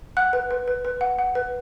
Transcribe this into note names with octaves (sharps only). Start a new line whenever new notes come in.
F#5 F#6
B4
B4
B4
B4
F#5
F#5
B4